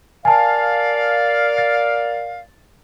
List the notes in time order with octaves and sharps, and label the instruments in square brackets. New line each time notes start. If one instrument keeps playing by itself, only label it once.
[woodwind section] A#4 D5 F5 [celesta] G#5 A5
[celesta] A6